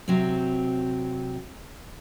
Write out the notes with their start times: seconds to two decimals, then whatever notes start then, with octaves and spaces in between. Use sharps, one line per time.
0.08 C3 F#3 C4